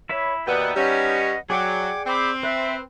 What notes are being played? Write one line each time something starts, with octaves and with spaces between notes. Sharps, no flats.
E4 B4 C#5 E5
D#2 B2 B3 D#4 D5 E5 G5
G3 C#4 B4 D#5 F#5
F#3 G#4 D5 F#5 G5 D6 G#6
C4 B5 D6
B4 E5 F#6